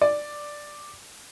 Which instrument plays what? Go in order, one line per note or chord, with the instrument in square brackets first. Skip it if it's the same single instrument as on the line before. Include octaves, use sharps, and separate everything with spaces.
[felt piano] D5